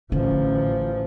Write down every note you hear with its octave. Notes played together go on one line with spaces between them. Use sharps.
A1 D3 F3 C#4